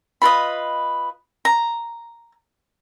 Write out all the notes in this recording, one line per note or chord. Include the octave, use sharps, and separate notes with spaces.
F4 B4 D#5 B5
A#5